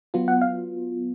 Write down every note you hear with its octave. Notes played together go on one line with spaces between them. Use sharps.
F#3 B3 F4
F#5
F5